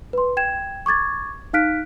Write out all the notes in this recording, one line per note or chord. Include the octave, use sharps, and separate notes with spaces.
B4 C6
G5 G#6 E7
C#6 D6 G#6 A6
D#4 F5 F6 F#6 B6 D7